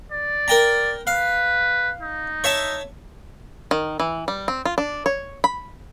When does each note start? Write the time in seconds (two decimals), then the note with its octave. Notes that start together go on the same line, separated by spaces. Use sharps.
0.12 D5
0.48 A#4 G5 A#5
1.07 B4 F5
2.01 D#4
2.44 C#5 E5 A5
3.71 D#3
4.00 E3
4.28 G3
4.48 C4
4.65 F4
4.78 D4
5.06 C#5
5.44 B5